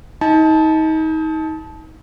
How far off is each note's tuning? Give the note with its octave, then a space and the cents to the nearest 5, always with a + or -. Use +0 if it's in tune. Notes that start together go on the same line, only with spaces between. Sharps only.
D#4 +30 A5 -15